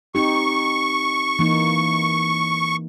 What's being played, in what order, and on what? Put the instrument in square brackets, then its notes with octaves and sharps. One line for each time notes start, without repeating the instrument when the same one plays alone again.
[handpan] C4 D#4 G4 [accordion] C#6
[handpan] E3 A#3 D#4